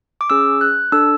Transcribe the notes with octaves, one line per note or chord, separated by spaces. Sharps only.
D6
C#4 G#4 E6
F#6
D4 A4 E6